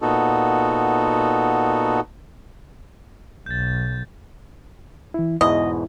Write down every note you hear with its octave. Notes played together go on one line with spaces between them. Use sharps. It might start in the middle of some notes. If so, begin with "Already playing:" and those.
A#2 B3 D#4 F#4 A4
B1 G6 A6
E3 E4
E2 G#2 B2 E4 D#5